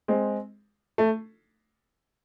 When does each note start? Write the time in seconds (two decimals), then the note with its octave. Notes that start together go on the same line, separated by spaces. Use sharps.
0.08 G#3 C4
0.98 A3